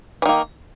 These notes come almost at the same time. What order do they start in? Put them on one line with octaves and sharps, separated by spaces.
E3 D#3 A#3